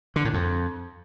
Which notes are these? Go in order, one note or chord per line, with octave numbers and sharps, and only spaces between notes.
D3
A2
F2